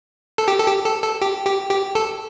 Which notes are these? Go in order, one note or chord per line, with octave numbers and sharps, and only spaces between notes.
A4
G4
A4
G4
A4
A4
G4
G4
G4
A4